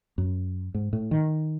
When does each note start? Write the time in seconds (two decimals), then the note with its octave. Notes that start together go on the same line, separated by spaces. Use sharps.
0.18 F#2
0.74 G#2
0.93 A2
1.11 D#3